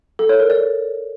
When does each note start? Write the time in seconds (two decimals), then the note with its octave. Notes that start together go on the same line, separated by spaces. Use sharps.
0.19 A4
0.29 C#5
0.40 A#4
0.50 D5